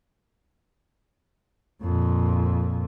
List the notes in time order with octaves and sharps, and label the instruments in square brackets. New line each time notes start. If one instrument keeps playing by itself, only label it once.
[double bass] F2 A#2